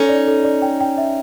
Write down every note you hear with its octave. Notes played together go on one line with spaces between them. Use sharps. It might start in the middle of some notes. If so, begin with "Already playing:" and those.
Already playing: C#4 D#4 A4
D5
A4
D5
G5
G5
E5